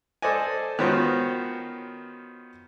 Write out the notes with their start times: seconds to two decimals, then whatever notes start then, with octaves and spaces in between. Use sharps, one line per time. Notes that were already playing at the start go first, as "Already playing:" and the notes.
0.22 A4 C5 D5 D#5 G#5
0.79 D#3 B3 C#4 F4 F#4 C5